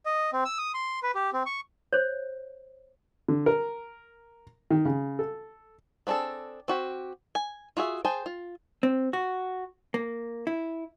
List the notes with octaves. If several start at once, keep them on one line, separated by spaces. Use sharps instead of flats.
D#5
C4
E6
D#6
C6
B4
G4
C4
C#6
C5 C#5
D3
A#4
D#3
C#3
A4
B3 C4 D4 G#4 A4
C4 F#4 G4
G#5
F4 F#4 G#4 E5
G#4 C5 G5 A5
F4
C4
F#4
A#3
E4